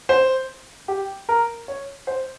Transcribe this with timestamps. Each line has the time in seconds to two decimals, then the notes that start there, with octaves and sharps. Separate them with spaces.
0.09 C5
0.88 G4
1.29 A#4
1.68 C#5
2.07 C5